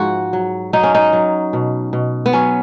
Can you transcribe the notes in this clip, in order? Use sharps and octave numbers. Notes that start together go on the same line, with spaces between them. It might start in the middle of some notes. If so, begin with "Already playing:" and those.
Already playing: G#2 F3 F#4
F#3
F#3 D#4
C#4
D#4
F#3
B2
B2
B3
F#3 C#4